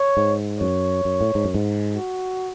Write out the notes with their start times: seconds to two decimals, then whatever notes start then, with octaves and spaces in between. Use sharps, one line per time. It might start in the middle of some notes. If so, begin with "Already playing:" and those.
Already playing: C#5
0.17 G#2
0.60 F#2 C#5
1.05 F#2
1.21 A2
1.35 G#2
1.45 F#2
1.54 G#2
1.95 F#4